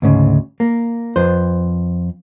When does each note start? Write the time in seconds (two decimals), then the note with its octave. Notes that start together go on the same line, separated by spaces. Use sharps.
0.02 D2 G#2 C#3
0.60 A#3
1.16 F2 B4 C5